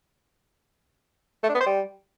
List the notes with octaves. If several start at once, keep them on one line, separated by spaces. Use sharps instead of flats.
A3
D4
B3
C5
G3